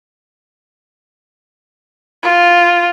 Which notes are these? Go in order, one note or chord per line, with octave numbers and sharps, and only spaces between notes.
F4